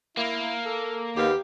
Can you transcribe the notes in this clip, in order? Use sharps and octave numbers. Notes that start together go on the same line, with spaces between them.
A#3 E4
A4
D#2 B3 G4 F5